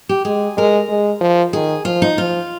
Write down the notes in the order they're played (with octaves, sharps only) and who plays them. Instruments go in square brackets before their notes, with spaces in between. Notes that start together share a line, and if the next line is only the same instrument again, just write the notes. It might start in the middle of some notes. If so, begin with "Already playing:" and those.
[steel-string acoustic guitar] G4
[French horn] G#3 [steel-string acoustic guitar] G#4
[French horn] G#3 [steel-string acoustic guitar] A#4
[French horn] G#3
F3
[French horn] D#3 [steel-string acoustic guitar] G#4
[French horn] F3 [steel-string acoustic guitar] F4
[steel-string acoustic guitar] D#4
[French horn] F3 [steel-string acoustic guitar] F4